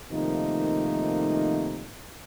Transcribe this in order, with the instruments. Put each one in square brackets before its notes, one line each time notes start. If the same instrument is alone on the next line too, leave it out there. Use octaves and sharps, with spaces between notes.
[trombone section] C3 D#3 F3 A3 A#3 D#4